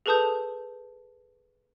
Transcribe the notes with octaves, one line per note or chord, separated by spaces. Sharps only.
G#4 A4 B4 A5 D#6 G6